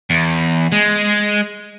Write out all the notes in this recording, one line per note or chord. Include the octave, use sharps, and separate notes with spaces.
E2
G#3